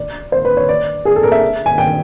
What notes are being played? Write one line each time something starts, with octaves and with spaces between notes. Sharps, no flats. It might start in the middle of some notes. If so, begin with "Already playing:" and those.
Already playing: D5
C5
B4
C#5
D5
G#4
A4
A#4
E5
G#5
G5